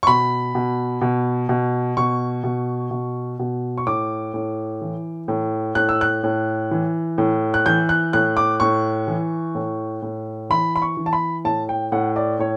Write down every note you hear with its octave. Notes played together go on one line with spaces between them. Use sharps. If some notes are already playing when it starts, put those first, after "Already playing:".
C#6
B2 B5
B2
B2
B2
B2 C#6
B2
B2
B2
C#6
A2 D6
A2
E3
A2
A2 F#6
E6
F#6
A2
E3
A2
F#6
E3 G6
F#6
A2 F#6
D6
A2 C#6
E3
A2
A2
E3 B5
B5
C#6
E3
A5
B5
A2 A5
G5
A2 F#5
D5
A2 C#5